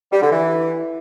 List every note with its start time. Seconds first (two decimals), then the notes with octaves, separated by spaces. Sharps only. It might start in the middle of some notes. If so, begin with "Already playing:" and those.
0.12 G3
0.21 D3
0.30 E3